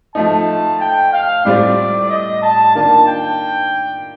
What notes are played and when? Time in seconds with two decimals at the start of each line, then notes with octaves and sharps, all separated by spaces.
0.15 F3 A3 D#4 A5
0.81 G5
1.13 F5
1.45 A2 G3 C4 F4 D5
2.10 D#5
2.42 A5
2.75 D#3 A#3 D4 F4 A5
3.08 G5